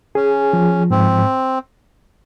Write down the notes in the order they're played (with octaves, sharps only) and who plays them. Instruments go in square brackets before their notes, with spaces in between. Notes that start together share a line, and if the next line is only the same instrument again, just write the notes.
[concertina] C#4 [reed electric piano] G#4
[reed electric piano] F3
[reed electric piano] G#2 [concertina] C4